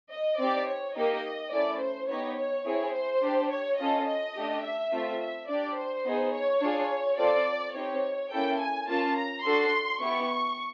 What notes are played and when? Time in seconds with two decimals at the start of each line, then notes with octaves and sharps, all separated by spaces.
0.11 D#5
0.39 C4 D#4 G4 D5
0.68 C#5
0.96 A#3 D#4 G4 D#5
1.52 A3 C#4 E4 D5
1.81 C5
2.09 B3 D#4 G4 C#5
2.37 C#5
2.66 C4 E4 G#4
2.94 C5
3.22 D4 G4
3.50 C#5
3.78 C#4 F4 A4 D#5
4.07 D#5
4.35 A3 D4 G4
4.63 E5
4.91 A3 C4 F4
5.20 E5
5.49 D4 G4 D5
5.77 C5
6.05 B3 D#4 G#4
6.33 C#5
6.61 D4 F4 G#4
7.18 C4 F4 A4 D5
7.75 C4 D#4 G4 C#5
8.31 A#3 C#4 E4 A4 G5
8.60 G#5
8.88 A#3 C#4 F4 A5
9.16 A#5
9.44 D4 F#4 A4 C6
10.01 B3 E4 G4 C#6